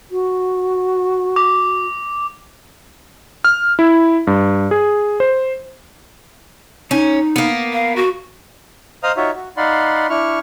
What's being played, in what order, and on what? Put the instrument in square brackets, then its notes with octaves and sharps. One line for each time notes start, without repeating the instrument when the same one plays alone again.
[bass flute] F#4
[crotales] D6
[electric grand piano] F6
E4
G2
G#4
C5
[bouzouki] C#4 [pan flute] D#4
[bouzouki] A#3 B3
[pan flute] F5
F#4
[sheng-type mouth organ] C5 D#5 F5 A#5 D#6 F6
D#4 F4 F#4 C#5 E5
F#4
D#4 D5 F5 F#5 B5 C6
D4 E4 C#6 F6